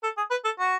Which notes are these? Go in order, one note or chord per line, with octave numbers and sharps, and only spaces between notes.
A4
G#4
B4
A4
F#4